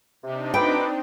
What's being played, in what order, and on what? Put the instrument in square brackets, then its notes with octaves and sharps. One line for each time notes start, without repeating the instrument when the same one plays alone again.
[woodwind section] C3 [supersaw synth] C4 D4 D#4
[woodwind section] D2 B5 D6 [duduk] B4 [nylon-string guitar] G5